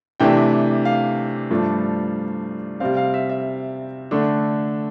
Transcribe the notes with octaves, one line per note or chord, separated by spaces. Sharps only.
C3 E3 A3 D4 G5
F5
G2 F3 A3 D4
C3 G3 C4 F5
F5
E5
E5
D3 A3 D4